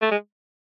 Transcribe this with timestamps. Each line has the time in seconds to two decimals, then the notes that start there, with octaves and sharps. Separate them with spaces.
0.02 A3
0.11 G#3